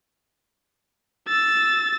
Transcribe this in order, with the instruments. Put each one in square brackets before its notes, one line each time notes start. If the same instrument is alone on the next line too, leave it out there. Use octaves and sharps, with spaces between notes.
[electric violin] E6 A6